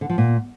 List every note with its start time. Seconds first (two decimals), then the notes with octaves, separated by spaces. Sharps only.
0.01 D3
0.10 F3
0.18 A#2